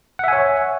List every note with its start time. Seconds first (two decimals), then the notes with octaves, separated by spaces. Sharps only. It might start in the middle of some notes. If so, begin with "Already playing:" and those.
0.19 F#5
0.24 E5
0.28 G#5
0.33 C#5